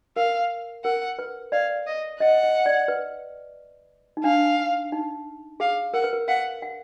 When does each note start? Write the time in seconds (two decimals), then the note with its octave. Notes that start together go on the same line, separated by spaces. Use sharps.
0.16 A#4 F5
0.84 A#4 F#5
1.19 B4
1.52 D5 F5
1.87 D#5
2.20 D#5 F#5
2.43 D#5
2.66 D5
2.88 B4
4.17 D#4
4.24 D4 F5
4.92 D#4
5.60 G#4 F5
5.94 A#4 F#5
6.04 B4
6.13 A#4
6.28 F5 F#5
6.62 F#5